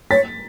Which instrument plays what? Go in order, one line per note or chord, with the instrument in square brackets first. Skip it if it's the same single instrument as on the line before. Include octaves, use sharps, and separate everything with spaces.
[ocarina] C#5 [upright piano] A6 B6